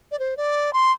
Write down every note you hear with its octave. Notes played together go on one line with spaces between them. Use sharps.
D5
C5
D5
C6